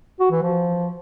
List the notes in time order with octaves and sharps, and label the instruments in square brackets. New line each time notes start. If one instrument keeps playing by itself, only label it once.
[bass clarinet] F#4
E3
F3